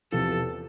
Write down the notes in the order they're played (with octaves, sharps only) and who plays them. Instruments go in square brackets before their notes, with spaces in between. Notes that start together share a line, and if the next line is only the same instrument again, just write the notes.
[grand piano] E2 C3 F3 [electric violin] A4